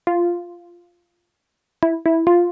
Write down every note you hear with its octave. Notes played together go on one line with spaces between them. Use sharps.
F4
E4
E4
F4